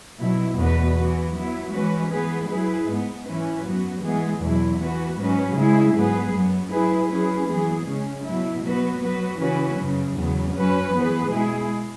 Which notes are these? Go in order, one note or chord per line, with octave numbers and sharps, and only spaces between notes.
B2 F#3 E4
E2 B2 B3 F#4 B4
E3 B3 F#4
F#3 B3 E4
E3 G#3 C#4 F#4 B4
E3 B3 G#4 B4
F#3 E4 G#4 B4
G#2 G#3 B3
E3 C#4 E4 B4
F#2 F#3 B3 F#4
E3 G#3 B3 G#4
E2 B2 F#3 E4
E3 B3 F#4 B4
G#2 F#3 C#4 F#4 B4
C#3 G#3 E4 G#4
G#2 F#3 B3 G#4 B4
F#2 F#3 B3
F#3 E4 G#4 B4
F#3 C#4 E4 G#4 B4
F#2 E3 B3 G#4
C#3 G#3 C#4
B2 F#3 E4
F#3 B3 F#4 B4
F#3 B3 F#4 B4
C#3 E3 C#4 F#4 B4
F#2 C#3 F#3
E2 C#3 F#3 B3
F#2 F#3 C#4 F#4 B4
E3 B3 G#4 B4
B2 G#3 E4 G#4